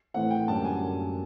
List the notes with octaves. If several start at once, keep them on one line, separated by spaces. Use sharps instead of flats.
A2 E3 A3 C4 F#5
G5
F#2 D3 G3 A#3 C#4 A5
G#5